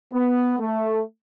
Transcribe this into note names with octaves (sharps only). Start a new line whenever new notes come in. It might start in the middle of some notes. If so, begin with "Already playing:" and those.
B3
A3